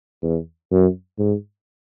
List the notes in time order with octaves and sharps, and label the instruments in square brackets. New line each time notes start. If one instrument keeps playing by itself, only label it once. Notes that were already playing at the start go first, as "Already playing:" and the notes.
[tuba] E2
F#2
G#2